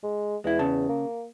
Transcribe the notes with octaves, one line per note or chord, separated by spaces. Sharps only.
G#3
E2 G#3 E4
C#3 A5
A#3